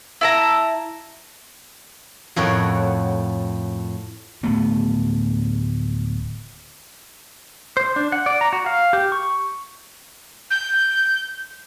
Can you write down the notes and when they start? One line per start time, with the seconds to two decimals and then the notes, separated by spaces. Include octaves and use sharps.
0.21 E4 A5 A#5
2.36 F2 A2 A#4 C#5 F#5
4.43 D1 A3 B3
7.77 C5
7.96 D4
8.12 F#5
8.26 D5
8.41 A#5
8.53 F#4
8.66 F5
8.93 G4
9.12 C#6
10.51 G6